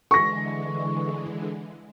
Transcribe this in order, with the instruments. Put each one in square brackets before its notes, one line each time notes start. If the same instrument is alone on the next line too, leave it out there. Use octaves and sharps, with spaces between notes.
[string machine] D3 E3 G#3 [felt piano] C#6 A#6